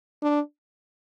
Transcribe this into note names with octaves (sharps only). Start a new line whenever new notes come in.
D4